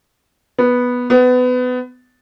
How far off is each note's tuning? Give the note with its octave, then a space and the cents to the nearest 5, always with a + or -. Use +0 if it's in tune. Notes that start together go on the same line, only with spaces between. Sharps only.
B3 -5
B3 +25